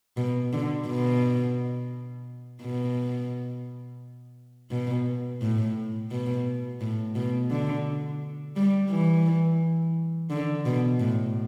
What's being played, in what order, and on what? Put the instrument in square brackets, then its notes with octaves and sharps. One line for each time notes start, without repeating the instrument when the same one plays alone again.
[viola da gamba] B2
D3
B2
B2
B2
A2
B2
A2
B2
D3
G3
E3
D3
B2
A2